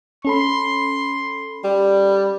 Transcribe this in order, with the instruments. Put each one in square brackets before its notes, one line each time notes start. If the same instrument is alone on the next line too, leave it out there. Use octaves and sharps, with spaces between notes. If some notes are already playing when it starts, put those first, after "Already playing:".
[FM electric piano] C#4 A4 B5 [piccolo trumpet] C6
[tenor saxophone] G3